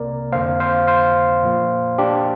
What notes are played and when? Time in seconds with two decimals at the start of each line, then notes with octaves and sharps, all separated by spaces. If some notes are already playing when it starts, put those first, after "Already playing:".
Already playing: C2 C3 A#3 A#4 D5
0.32 F2 D3 A#3 C5 F5
0.60 C5 F5
0.87 C5 F5
1.43 A#2 F3 A#3
1.98 D4 G4